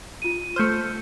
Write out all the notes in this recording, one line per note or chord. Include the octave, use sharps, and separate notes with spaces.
F4 D#7
A3 C5 F6 G6 C#7